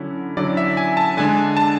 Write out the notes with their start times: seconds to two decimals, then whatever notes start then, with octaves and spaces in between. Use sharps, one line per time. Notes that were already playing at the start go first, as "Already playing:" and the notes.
Already playing: D3 F#3 C#4 E4
0.37 D3 F#3 C#4 E4 D5
0.57 E5
0.77 G#5
0.97 A5
1.17 D3 G#3 D4 G#5
1.57 A5